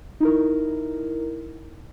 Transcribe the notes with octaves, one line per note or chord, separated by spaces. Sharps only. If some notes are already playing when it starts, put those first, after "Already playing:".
D#4 E4 A#4